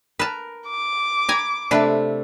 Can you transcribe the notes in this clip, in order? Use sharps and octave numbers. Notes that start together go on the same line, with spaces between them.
A#4 B4 A5
D6
G#5 A#5 B5
C3 A3 D4 A4 B4